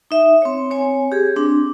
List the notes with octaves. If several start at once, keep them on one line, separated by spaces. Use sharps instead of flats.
D#4 E5
C4 C#5
C4 C#5 G#5
G4 G#4
C4 D4